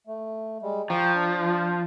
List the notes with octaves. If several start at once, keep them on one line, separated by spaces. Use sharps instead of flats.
A3
G3 G#3
F3 G5 A#5 C#6
D4